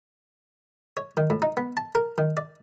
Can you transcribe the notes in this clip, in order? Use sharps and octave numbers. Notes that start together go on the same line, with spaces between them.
C#5
D#3
A2
D#4
B3
A5
A#4
D#3
D5